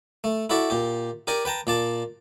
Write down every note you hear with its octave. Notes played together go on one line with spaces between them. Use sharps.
A3
E4 F#4 A4 D5 E5
A#2 G4
G4 A#4 D5 G#5
B4 G5 A5 A#5
A#2 D5 A5